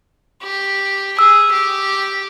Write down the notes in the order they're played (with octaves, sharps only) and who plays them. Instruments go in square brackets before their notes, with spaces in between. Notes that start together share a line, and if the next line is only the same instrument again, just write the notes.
[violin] G4
[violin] G#4 [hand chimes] E6
[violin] G4